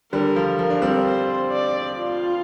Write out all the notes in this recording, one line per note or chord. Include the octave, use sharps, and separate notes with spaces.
D3 G3 A#4
F3
F3 A#4
D4
G3 C4
C5
D5
F4